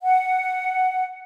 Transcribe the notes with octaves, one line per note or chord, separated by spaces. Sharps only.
F#5